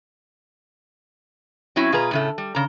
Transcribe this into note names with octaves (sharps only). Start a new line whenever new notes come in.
F#3 C4 C#4 E4
B2 F4 G#4 B4 A#5
A2 C#3 A3
G3
C#3 A#5